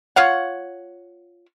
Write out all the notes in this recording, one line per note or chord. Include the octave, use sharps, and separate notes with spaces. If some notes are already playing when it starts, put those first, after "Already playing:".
F4 C#5 F5 F#5